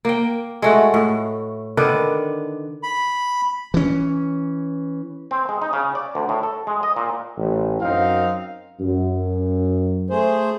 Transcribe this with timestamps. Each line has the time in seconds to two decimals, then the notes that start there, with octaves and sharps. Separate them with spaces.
0.05 A#3 G5
0.62 G#3 A3 F#4
0.94 A2
1.77 D3 D#3 D4 B4
2.83 B5
3.74 E3 C#4
5.31 C4
5.49 G#3
5.62 D#4
5.73 C#3
5.95 D5
6.15 D2
6.29 A2
6.43 A4
6.67 G#3
6.83 D#5
6.96 A#2
7.37 A1
7.82 F#2 C4 D#4 F5
8.80 F#2
10.10 A3 G#4 C5